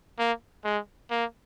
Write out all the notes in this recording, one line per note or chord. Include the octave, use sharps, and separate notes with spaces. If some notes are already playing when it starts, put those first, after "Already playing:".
A#3
G#3
A#3